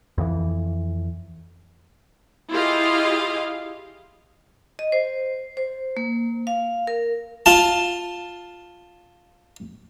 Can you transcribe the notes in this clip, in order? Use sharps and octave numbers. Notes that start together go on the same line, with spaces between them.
F2 E3
E4 F4 G4 G#4 D#5 F5
D#5
C5
C5
A#3
F5
A#4
F4 A5